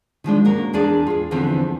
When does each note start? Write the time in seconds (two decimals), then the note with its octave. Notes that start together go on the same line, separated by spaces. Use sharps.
0.24 D#3 F3 G#3 D4
0.45 A#3 C#4 F#4 A#4
0.73 E2 D4 G#4 D5 G#5
1.07 F4 G#4
1.31 E2 D3 E3 F3 B3 C4